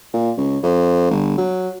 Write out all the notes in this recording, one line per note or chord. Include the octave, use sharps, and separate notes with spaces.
A#2
C#2
F2
G1
F#3